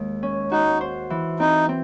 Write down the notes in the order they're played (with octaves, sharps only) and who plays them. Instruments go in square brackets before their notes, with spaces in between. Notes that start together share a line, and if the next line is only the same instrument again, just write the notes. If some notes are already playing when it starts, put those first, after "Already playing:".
Already playing: [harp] D#2 G#3
C#4
[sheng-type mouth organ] D#4 [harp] F#4
[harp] C5
E3
[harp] C4 [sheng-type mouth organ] D#4
[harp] C4